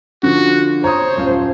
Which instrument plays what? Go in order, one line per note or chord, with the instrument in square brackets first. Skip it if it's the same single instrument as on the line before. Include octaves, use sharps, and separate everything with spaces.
[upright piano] D3 F3 [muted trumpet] F#4
[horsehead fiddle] C5 [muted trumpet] C#5 [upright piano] A#5 D#6
[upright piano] D#1 F#2 F4